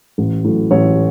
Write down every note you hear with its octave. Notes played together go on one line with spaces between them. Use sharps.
A1
A2 F#3
A1 C#5